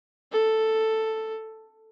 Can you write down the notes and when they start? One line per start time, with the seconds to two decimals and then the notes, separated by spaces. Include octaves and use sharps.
0.32 A4